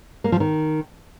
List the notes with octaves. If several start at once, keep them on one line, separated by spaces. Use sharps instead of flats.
A#3
F3
D#3